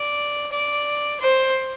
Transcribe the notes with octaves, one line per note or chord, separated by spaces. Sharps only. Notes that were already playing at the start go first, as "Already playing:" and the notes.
Already playing: D5
D5
C5